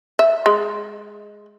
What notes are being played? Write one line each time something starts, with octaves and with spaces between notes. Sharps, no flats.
E5
G#3